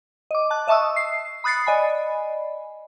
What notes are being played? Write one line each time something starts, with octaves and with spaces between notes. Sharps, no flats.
D#5 D6
A5 F#6
D#5 E5 A5 C#6 D#6 E6
C7
B5 D#6 F#6 A6 C7 C#7
D5 D#5 G#5 B5